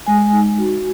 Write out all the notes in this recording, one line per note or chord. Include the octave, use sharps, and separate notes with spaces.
G#3 G#5
D#4
F#4